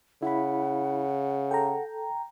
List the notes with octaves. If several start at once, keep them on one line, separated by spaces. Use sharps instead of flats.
C#3 E4 F#5 B5
A4 G5 A#5